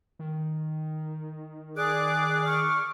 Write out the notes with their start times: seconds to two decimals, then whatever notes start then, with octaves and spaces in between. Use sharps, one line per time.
0.19 D#3
1.76 G#4 D5 D6 F#6
2.44 C#6 F6